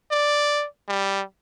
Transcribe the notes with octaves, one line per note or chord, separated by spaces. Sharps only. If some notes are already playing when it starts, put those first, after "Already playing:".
D5
G3